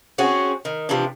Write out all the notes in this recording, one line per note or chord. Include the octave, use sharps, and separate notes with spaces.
C4 C#4 F#4 G#4
D#3
C3 E3 F3 D4